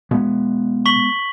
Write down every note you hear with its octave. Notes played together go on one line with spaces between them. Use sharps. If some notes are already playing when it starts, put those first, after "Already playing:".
B2 G#3 B3
C#6 B6 F#7